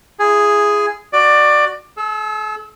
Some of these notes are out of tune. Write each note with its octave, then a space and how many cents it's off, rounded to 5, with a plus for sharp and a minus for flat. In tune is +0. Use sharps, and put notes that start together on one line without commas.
E4 +40 G#4 +0
F#4 +0 D5 +15
A4 -45 E6 +0